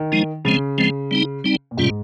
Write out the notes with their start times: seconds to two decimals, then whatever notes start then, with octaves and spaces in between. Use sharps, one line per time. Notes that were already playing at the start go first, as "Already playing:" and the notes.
Already playing: D#3
0.12 F3 G#3 D#4
0.45 C#3 F3 G#3 C4
0.78 F3 G#3 C4
1.11 G3 C4 D#4
1.44 G3 C4 D#4
1.71 A#2
1.77 G#2 C3 G3 C#4 F4